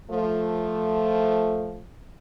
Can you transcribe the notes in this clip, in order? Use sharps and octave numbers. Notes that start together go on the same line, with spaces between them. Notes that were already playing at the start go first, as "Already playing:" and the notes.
F3 A3